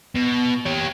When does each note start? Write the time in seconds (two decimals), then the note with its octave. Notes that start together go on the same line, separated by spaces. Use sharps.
0.15 B2
0.66 G4 C#5